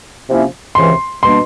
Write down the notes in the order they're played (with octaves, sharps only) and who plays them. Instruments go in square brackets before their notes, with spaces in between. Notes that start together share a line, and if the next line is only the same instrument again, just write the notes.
[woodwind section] C3 F3 A#3 C#4 E4
[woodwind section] C#2 C3 E3 [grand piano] C6
[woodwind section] B2 G3 A#3 D4 [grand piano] C6